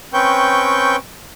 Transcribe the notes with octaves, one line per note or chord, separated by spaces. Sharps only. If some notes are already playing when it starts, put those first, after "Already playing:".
C4 C#4 B4 G5 C#6 G6